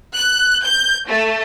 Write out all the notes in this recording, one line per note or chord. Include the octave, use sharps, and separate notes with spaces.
F#6
G6
A3